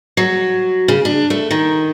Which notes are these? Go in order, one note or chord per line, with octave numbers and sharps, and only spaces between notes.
F#3
C#3
D4
A3
D#3